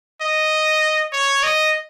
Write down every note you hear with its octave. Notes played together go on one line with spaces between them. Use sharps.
D#5
C#5
D#5